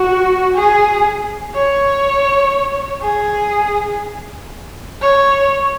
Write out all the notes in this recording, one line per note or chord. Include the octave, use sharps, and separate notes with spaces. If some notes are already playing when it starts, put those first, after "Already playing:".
Already playing: F#4
G#4
C#5
G#4
C#5